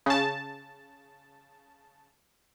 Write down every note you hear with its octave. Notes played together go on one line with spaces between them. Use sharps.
C#3 A5